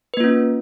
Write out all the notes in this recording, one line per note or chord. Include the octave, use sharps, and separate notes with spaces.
A#3 C#4 F4 B4